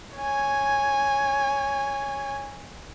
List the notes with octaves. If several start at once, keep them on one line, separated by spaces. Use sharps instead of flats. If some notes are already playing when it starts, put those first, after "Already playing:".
C#5 G#5